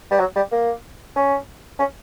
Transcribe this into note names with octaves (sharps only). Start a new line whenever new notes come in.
G3
F#3
G3
A#3
C#4
C#4